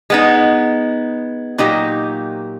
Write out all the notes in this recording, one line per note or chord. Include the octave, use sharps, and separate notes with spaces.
G#3 B3 D#4
A#2 F#3 A#3 D#4 G4